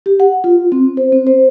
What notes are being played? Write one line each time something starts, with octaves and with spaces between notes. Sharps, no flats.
G4
F#5
F4
C4
C5
C4
C5